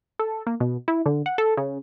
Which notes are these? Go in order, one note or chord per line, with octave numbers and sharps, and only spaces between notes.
A4
A#3
B2
E4
D3
F#5
A4
C#3